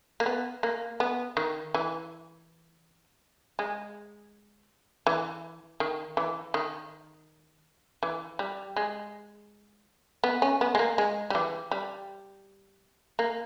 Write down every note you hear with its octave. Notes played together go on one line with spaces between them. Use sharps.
A#3
B3
A#3
B3
D#3
E3
G#3
E3
D#3
E3
D#3
E3
G3
G#3
B3
C#4
B3
G#3
A#3
G#3
G3
E3
G3
A#3